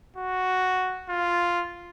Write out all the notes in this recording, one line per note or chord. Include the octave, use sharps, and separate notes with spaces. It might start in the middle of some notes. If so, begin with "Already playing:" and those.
F#4
F4